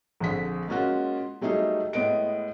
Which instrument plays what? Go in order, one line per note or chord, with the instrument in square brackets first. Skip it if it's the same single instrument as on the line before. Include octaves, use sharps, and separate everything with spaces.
[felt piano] A#1 F2 D3 G#4 B6
G#3 A#3 C#4 F4 F#4
F#3 G3 A3 D#4 G#4
A2 G#3 B3 D#5 D7